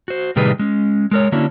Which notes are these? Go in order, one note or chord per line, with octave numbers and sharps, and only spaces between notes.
F#4 C5
A2 C3 D#3 G3 G#4 B4
G#3 C#4
G#3 A#4 C#5
D3 A#3 C#4 D4 E4 F#4